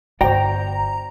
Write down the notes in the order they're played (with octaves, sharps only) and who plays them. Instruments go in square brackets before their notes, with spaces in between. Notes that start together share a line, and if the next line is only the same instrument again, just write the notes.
[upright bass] G1 [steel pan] F#4 C5 [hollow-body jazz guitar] D5 G5 [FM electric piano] A#5